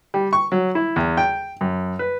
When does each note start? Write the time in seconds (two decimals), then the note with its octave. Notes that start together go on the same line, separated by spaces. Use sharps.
0.14 G3
0.33 C#6
0.52 F#3
0.75 E4
0.96 E2
1.17 G5
1.61 F#2
1.99 B4